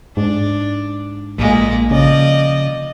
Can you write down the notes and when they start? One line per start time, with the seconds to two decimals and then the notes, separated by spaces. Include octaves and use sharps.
0.17 G#2 D4
1.38 A#1 A#2 G#3
1.91 C#3 F3 D5 D#5